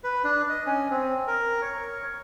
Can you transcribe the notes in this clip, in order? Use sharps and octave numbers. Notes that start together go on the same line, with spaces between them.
B4
D4
D#5
C#4
C4
A#4
C#5